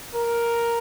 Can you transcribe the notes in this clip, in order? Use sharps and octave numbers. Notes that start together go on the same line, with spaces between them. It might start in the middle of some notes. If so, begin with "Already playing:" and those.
A#4